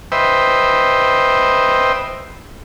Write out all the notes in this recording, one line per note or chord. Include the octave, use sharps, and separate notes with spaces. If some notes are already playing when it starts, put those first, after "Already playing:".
B4 C5 D#5 E5 G5